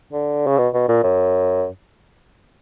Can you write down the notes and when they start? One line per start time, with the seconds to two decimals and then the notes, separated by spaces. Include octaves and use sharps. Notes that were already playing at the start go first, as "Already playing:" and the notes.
0.13 D3
0.47 C#3
0.58 B2
0.74 B2
0.88 A#2
1.03 F#2